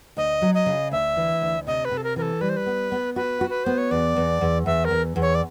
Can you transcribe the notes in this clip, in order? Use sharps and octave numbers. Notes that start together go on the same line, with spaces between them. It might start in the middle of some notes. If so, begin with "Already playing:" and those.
D2 D#5
F#3
D#5
C#3
D2 E5
E3
D2
C3 D#5
B4
C3
A4
A#4
E3 A#4
A4
G3 B4
C5
B4
B3
B3
F#4 B4
F#4
B4
B3 C5
C#5
E2 D5
E2
E2
E2 E5
A#4
E2
E2
C#5
D5